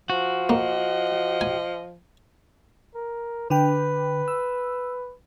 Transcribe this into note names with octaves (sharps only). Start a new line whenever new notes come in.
F3 F#4
A#3 D#5
G#5
A#4
D3 B4 G5
E6